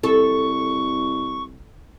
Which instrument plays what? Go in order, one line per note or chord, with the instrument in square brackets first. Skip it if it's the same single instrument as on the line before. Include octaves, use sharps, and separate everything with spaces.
[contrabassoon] C2 [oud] A4 [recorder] C#6